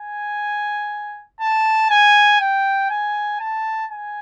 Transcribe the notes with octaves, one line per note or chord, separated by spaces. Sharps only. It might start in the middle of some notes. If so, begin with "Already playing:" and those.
Already playing: G#5
A5
G#5
G5
G#5
A5
G#5